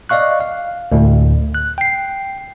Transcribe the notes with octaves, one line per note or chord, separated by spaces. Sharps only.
D5 D#5 F5 C#6 F#6
F5
D2 A2
F#6
G5 C7